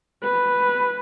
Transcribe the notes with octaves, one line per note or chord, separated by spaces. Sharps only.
B4